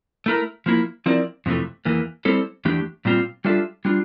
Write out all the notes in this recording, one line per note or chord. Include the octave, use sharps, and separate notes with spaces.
A3 E4 A#4
F3 A#3 E4
F3 C4 E4 A#4 D5
F2 C3 E3 A3
E2 E3 A#3
G3 C4 E4 A4 C5
E2 E3 A3 D4 G4
A#2 G3 C4 F4
G3 D4 F4 A4 E5
G3 D4 F4